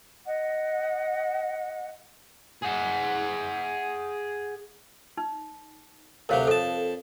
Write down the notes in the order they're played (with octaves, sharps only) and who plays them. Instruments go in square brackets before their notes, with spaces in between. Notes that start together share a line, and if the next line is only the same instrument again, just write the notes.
[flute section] D#5 F#5
[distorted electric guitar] G#4 F#5
[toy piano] D#4
[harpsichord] D2 C3 F#3 [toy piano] A#4 C#5 F5
[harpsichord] F2 A5 [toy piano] A4